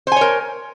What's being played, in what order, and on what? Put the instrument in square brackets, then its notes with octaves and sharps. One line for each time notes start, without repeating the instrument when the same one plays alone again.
[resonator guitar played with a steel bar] C5
G#5
C#5
A#4